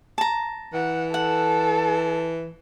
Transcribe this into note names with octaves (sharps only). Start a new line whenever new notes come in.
A5 A#5
E3 F#5
A4 F#5